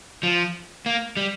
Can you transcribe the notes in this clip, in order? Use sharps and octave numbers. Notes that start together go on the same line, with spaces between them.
F3
A#3
G3